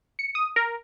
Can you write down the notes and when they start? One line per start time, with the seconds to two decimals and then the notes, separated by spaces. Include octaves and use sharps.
0.19 C#7
0.35 D#6
0.56 A#4